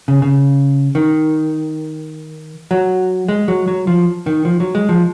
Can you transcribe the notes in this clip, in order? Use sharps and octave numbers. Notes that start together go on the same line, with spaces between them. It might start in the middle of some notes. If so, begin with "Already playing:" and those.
C#3
C#3
D#3
F#3
G#3
F#3
F#3
F3
D#3
F3
F#3
G#3
F3